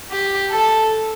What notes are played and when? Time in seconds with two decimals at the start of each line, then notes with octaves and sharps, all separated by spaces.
0.11 G4
0.51 A4